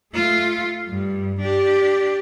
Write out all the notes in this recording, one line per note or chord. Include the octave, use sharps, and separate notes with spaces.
A3 F4
G2
D4 G4